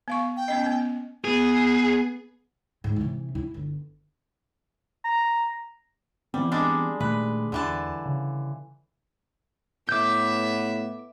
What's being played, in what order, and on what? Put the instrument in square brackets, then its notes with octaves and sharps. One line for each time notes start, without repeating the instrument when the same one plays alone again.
[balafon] B3 F5 C#6
[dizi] G5
[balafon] B3 C#4 D#5
B3
[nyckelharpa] B3 [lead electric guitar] G#4
[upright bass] G#2
C3 E3
E4
G1
[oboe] A#5
[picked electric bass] E3 B3 C4 [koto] G3
[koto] G3 G#3 D4
[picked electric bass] A#2 D#3 A3 [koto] B4
[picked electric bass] E2 [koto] D3 E3 A5
[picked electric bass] C#3
[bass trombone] A2 [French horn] B3 [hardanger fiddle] E5 [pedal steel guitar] D6 G6